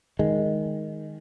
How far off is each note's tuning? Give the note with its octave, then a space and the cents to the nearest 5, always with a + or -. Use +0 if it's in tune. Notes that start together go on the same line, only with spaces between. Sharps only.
D#3 +0 G#3 +0